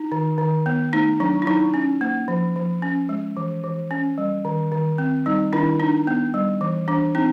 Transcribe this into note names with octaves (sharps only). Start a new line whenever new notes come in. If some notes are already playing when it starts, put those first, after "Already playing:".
Already playing: D#4
D#3
D#3
B3
A3 D#4
F#3 D4
E4
F#3 D#4
C#4
A#3
F3
F3
C#4
G#3
E3
E3
C#4
G3
D#3
D#3
C4
G3 D#4
D#3 D4 E4
D4 D#4
B3
G3
E3
E3 D4
C4 D#4